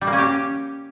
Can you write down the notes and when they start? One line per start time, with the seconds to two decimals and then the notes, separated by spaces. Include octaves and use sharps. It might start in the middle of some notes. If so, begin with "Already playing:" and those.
0.01 G3
0.07 A#3
0.13 C#4
0.18 G4